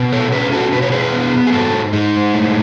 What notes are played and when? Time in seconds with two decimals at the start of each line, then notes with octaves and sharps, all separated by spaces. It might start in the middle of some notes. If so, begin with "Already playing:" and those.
Already playing: B2 B3
0.13 A4 C#5
0.32 C#4 G#4 B4
0.52 F#4 A4
0.72 B2 B4
0.82 C#5
0.92 G#4 B4
1.12 B3
1.47 G#4
1.53 G#2 F#4 A4
1.93 G#3 D#4
2.33 A2